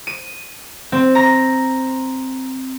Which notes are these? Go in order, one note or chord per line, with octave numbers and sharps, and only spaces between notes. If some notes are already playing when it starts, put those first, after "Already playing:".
D#7
C4
A#5